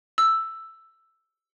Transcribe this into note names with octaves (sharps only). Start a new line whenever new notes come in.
E6